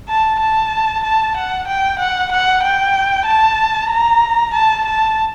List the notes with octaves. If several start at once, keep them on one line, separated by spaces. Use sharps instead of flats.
A5
A5
A5
F#5
G5
F#5
F#5
G5
A5
A#5
A5
A5